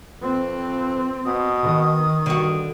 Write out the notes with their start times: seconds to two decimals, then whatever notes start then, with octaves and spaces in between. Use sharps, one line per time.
0.22 F2 C4 B4
1.25 B2 D#6
1.62 D#3
2.26 G2 D3 F#4